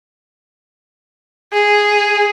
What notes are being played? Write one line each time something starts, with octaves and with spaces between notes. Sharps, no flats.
G#4